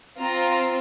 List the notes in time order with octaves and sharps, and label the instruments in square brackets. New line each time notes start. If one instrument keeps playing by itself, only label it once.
[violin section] C4 F4 A#5